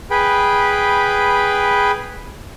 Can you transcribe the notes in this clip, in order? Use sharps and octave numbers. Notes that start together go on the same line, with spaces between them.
G#4 B4 G5 B5